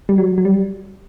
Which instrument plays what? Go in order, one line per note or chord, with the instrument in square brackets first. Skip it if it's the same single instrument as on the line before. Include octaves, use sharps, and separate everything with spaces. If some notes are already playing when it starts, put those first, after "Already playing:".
[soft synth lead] G3
F#3
F#3
G3